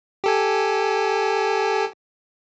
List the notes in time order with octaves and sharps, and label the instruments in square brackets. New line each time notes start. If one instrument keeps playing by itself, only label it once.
[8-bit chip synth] G4 A4 G#5